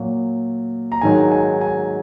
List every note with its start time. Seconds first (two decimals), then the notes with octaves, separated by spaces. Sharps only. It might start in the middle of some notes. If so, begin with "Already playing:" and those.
Already playing: A#2 F#3
0.92 A#5
1.01 G#2 D#3 F#3 G#5
1.32 G#5
1.61 G#5